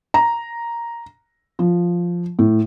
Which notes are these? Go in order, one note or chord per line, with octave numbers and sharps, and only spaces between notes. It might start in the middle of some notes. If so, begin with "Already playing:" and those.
A#5
F3
A2